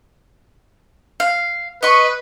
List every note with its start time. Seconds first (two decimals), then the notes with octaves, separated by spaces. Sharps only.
1.20 F5
1.83 B4 D#5 C#6